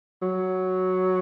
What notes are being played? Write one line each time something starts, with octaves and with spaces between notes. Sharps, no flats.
F#3